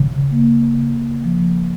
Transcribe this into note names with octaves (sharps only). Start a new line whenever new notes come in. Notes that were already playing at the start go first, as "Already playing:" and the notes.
Already playing: C#3
A#3
C#3
F3